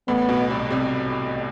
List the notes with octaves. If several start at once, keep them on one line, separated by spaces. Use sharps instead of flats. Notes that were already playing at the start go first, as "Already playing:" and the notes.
A1 A2 B3
B1 B2
C2 C3
C2 C3